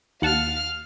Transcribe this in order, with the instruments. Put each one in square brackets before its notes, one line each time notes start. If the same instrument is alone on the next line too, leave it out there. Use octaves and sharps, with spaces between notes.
[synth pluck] D#2 F#5 A5 [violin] F5 F6